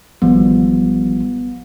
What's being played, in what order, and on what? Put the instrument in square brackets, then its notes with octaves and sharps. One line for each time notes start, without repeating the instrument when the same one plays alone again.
[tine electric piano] G#1 F3 G3 [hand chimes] B3